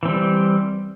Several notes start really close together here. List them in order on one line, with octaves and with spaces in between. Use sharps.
E3 C4 G3